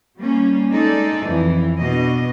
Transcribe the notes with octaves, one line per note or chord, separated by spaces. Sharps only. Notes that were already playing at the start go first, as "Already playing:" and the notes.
G3 A#3 C#4
G#3 D#4 A4 D5
F2 E3
B2 D4 D#5